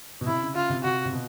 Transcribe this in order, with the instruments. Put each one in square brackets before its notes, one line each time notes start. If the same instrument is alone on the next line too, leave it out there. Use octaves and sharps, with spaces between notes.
[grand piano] B2
[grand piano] C3 [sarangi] E4
[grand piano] C#3
[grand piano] C#3 [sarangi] F4
[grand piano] C3
[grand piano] C3 [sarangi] F#4
[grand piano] C3
B2